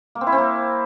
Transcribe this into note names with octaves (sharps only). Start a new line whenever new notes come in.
A#3
C4
E4
C4
A#3